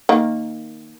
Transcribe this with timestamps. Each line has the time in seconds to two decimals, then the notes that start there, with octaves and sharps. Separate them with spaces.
0.09 D#3 A#3